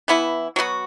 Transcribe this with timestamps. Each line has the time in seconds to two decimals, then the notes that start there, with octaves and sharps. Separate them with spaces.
0.08 E3 B3 E4
0.56 F#3 B3 F#4